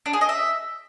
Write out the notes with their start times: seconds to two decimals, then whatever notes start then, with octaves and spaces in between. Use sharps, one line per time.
0.06 D4
0.13 G#4
0.21 D#5
0.29 E5